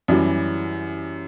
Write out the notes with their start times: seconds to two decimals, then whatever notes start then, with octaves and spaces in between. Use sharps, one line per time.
0.08 F#2 E3 G3